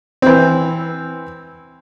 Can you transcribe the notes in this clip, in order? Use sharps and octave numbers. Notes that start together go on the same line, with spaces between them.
E3 C4